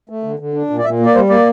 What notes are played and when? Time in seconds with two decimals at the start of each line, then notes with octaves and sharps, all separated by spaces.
0.09 A3
0.23 D3
0.39 D3
0.54 D4
0.70 A#2
0.78 D5
0.84 A#2 E5
1.00 A#3
1.06 D5
1.15 G3 C5
1.30 A#3 D5